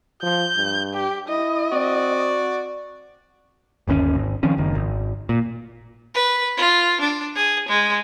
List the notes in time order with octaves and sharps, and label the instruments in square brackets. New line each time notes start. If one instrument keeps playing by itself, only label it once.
[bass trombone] F3 [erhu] G6
[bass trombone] G2
[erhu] G4
[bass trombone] E4 [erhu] D#5
[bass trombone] C4 [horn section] F#4 D5
[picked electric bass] G1 D#2 D3 C#4
G#1
D#3 F3 C4 C#4
F#1 D#3
G#1
A#2
[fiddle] B4
F4
D4
G#4
G#3